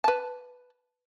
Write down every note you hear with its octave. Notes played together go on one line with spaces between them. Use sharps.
B4 A5